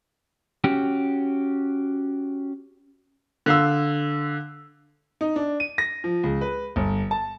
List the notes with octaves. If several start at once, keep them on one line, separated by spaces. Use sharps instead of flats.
C#4 F#4 G4
D3 F5 E6
D#4
D4
D#7
A#6
F3
C#2
B4
G1
A5